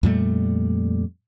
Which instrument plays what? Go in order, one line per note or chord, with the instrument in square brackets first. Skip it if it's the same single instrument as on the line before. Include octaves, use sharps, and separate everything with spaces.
[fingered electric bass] F2 A#2 G3 A3